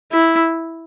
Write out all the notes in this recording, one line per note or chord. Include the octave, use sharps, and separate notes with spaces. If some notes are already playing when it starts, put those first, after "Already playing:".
E4